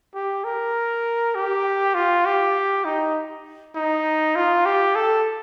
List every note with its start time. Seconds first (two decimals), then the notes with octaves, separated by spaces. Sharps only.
0.14 G4
0.45 A#4
1.35 G4
1.95 F4
2.26 G4
2.85 D#4
3.76 D#4
4.36 F4
4.66 G4
4.96 A4